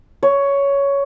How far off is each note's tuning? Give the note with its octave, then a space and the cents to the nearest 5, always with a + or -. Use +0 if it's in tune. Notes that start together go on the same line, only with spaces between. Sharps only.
C#5 +10